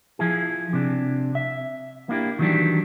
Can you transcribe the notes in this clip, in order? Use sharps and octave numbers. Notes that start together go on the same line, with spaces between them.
F3 E4 G#4
C3 D4
E5
A#3 D4 E4 F#4 G4
D#3 E3 F#3 G3 D4